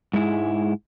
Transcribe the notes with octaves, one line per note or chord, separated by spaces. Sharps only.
G#2 G#3 E4